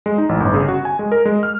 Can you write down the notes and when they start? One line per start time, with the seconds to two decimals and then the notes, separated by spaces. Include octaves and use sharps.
0.06 G#3
0.18 D#4
0.29 A1
0.40 G1
0.54 C#3
0.68 F#4
0.85 G#5
0.99 G#3
1.12 A#4
1.25 G#3
1.43 F6